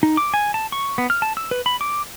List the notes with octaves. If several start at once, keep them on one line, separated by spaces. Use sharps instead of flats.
D#4
D6
G#5
A5
C#6
B3
F6
A5
E6
B4
B5
D6